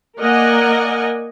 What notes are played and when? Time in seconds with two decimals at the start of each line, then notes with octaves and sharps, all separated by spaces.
0.19 A#3 A#4 D5 D#5 F#5 G#5